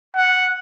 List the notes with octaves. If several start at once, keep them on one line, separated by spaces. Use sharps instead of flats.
F#5